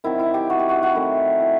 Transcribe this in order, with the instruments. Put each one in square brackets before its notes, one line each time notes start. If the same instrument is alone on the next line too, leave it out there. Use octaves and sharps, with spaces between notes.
[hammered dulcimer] D#3 F#3 C4 E4
E4
G4
F#4
G4
F#4
F#4
D#3 A3 C4 E4
E4